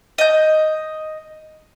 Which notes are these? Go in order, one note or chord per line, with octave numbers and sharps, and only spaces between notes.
D#5 G6